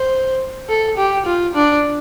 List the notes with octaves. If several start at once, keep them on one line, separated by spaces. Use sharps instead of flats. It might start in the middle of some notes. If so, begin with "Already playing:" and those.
Already playing: C5
A4
G4
F4
D4